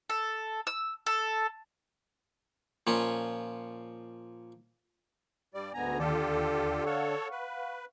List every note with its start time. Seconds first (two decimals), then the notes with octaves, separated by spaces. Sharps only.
0.10 A4
0.67 E6
1.06 A4
2.87 A#2 F3 C#4
5.54 G2 G3 D5
5.74 D2 G#2 D3 B3 G#5 A#5
6.00 D#2 D3 F4 G4 A4 D5 A5
6.85 A4 C#5 F5 F#5 C#6
7.31 B4